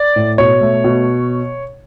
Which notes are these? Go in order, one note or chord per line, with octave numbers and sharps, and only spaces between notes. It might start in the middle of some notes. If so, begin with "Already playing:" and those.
Already playing: D5
A2
B2 C#5
A3
B2